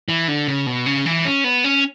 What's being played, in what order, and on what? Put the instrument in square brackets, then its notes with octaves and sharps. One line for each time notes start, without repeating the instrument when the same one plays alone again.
[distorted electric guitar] E3
D3
C#3
B2
C#3
E3
C#4
B3
C#4